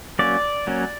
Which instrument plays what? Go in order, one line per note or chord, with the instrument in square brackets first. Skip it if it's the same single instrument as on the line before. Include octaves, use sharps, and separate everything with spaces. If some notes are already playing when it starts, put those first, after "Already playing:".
[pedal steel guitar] F#3 A#3 C#4 D5
F#3 A#3 C#4